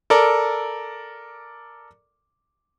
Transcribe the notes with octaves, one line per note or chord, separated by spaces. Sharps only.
A4 A#4 D5